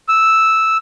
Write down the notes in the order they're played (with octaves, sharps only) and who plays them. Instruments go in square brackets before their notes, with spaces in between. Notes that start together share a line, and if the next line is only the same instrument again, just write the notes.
[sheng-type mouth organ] E6